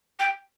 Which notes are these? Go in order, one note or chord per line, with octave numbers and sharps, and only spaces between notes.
G5